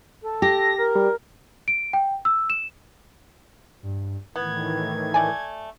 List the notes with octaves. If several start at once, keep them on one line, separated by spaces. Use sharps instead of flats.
A4
G4 A#6
A#4
G3
D7
G5
E6
E7
G2
A2 D#3 E3 B3 G#6
A3 D5 G#5